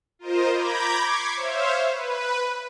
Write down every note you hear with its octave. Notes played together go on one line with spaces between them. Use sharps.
F4 A#4 C5 D#5
A#5 B5 D6 G6 G#6 A#6
C#6 D6 G#6 B6 C7
C5 C#5 E5 F5
B4